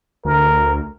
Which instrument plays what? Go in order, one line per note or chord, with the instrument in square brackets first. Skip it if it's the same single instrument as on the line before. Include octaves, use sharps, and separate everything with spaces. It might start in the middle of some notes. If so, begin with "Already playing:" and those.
[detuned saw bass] D2 [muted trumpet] A#4